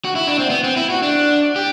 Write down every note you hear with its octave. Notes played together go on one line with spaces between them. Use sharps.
F#4
E4
D4
C4
B3
C4
E4
F#4
D4
G4